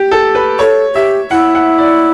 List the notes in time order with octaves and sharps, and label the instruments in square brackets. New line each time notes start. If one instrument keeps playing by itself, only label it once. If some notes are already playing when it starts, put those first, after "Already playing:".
Already playing: [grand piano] G4
A4
B4
[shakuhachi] A4 [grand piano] C#5
[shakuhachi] G4 [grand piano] E5
[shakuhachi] E4 [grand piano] F#5
[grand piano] F#5
D5